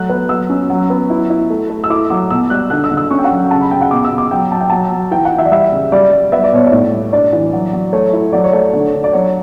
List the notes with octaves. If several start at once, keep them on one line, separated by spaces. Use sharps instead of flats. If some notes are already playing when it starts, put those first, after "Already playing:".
Already playing: F#3 A3 F#6
B3
F#3 E6
C#4
F#3
B3
E4
E4
A3
A3
E6
E4 D6
F#3 D6
B2 E6
G3 F#6
D3 F#6
E6
D3
E6
C#4 C#6
G5
F#5
F#3
C#3 A5
B5
C#3 G5
F#5
B2 D6
E6
B2
D6
F#3 G5
F#3 A5
G5
F#3 A5
F#3
E3 G5
F#5
E3
E5
D5
G3 E5
C#3
G3 D5
G3
B3 E5
D5
B2 C#5
D5
A2
G3
D4 D5
E3
F#3
F#3
A3 C#5
E4
F#3 D5
C#5
A3 D5
D3
D3
D5
F#3 C#5